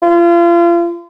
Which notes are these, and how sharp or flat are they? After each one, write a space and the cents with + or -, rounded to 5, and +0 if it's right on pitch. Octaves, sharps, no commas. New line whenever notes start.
F4 -35